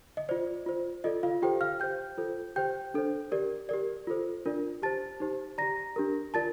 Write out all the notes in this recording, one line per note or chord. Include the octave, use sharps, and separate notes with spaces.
D#5
F4 C5 D5
F4 C5
F4 A4 D5 D#5
F4 F5
F4 G4 A4 C5 G5
F5 F6
G4 C5 G5 G6
F4 A4 C5
G4 C5 G5 G6
D4 A4 C5
G4 A#4 D5
G4 A#4 D5
F4 A4 C5
D4 F4 A#4 D5
G4 C5 A5 A6
D#4 G4 C5
G4 D5 A#5 A#6
D4 G4 A#4
F4 A#4 D5 A5 A6